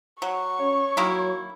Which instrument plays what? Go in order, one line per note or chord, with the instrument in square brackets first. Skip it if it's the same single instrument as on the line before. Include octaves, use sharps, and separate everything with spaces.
[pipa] F#3 [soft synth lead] F#5 [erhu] C#6
[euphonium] C#4 [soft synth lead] C#5
[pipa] D#3 A#3 E4 [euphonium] F#3